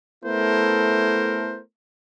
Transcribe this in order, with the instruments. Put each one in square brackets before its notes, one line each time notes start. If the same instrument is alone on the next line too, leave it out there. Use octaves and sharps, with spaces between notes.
[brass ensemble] A3 B3 E4 A4 A#4 C5